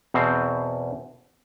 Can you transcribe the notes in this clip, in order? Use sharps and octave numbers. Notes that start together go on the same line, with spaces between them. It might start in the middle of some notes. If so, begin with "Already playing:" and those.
E2 B2 C4 C5